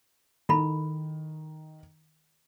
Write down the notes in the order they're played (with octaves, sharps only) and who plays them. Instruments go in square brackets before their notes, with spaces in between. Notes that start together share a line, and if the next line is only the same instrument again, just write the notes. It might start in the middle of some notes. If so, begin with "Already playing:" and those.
[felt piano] D#3 [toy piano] E4 A4 B5